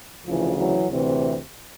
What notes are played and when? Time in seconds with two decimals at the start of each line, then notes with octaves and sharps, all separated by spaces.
0.25 D2 C#3 E3 F3
0.57 E3 F#3
0.87 D2 C3 E3